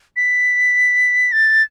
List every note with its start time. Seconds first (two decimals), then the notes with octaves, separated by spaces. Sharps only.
0.16 B6
1.32 A6